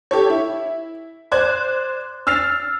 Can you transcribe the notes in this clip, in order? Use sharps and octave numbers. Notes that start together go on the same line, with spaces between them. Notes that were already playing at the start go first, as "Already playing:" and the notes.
G4 A4 C#5
E4
C5 D5 F#6 G#6
E6 F6 A6 C7 F7